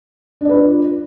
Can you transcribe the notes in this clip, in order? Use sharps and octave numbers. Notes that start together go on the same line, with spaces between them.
D4 F4 B4 D5